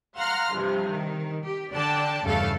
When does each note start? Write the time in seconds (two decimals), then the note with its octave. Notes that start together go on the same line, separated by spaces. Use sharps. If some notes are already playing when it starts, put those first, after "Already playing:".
0.17 F5 F#5 A#5 C6 F6
0.53 G2 C3 F3
0.92 D#3
1.44 G4
1.74 D3 D4 D5 G5 A5
2.24 E2 G2 C#3 A3 A4 F5